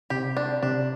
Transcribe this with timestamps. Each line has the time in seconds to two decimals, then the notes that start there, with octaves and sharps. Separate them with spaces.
0.10 C3 G4
0.37 D4
0.63 C3 D4